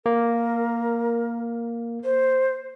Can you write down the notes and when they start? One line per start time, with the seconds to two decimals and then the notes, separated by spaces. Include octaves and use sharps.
0.06 A#3 A#4
2.05 C5